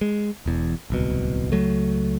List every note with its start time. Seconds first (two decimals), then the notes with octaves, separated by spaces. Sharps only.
0.01 G#3
0.46 E1 E2
0.90 D1 C2 B2
1.52 C#2 F#3 A3